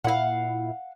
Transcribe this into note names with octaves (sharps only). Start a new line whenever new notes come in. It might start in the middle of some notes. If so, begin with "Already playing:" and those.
A#2 E4 F5 F#5